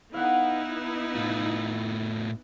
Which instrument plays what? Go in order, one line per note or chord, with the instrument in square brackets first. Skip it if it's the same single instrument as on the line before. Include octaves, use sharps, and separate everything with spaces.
[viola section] B3 D#4 E4 [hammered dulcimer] F5 F#5
[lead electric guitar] A2 F4